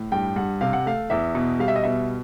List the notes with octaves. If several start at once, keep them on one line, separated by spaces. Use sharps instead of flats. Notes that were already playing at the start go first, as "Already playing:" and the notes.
Already playing: A2
G2 G5
G2 F#5
C3 F5
F#5
A3 F5
E2 E5
B2
G3 F5
E5
D#5
B2 E5